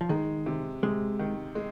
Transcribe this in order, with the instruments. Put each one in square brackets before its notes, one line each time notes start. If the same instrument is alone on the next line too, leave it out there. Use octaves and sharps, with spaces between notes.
[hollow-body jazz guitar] F3
[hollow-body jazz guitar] D#3 [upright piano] G#3
[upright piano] C3
[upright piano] C3 [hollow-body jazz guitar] G#3
[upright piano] D#3
G#3